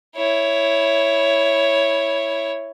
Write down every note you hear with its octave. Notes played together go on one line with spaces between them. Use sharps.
E4 C#5